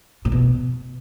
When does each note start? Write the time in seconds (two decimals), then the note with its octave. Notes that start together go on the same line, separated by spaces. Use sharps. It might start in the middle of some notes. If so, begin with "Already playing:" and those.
0.25 A2
0.32 B2